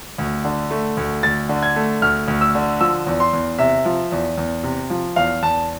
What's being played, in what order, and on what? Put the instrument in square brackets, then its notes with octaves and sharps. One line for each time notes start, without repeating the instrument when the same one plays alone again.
[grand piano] D2
D3
A3
D2
D2 A6
D3
G#6
A3
D2 F6
D2
E6
D3
F3 E6
E2
C6
E2
C3 E5
F3
E2
E2
C3
F3
E2 F5
E2 A5